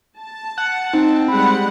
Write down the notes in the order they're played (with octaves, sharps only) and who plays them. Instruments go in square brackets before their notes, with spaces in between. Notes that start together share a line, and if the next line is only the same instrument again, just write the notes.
[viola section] A5
[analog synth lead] F#5
[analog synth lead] C4 [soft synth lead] D#4
[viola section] G3 G#3 F#5 [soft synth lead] B5